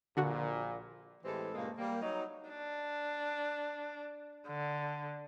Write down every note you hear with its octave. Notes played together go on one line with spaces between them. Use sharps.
A#1 A#2 D3 F#4
A2 E3 G#3 C4 G4 A4
G2 A#2 C#3 G#3 A#3
G3 A#3
F#3 D#4
D4
D3